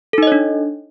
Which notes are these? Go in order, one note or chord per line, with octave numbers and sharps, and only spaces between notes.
D4 D#4 A4 C#5 D#5